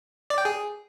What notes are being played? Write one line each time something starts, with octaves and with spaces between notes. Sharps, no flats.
D5
G5
G#4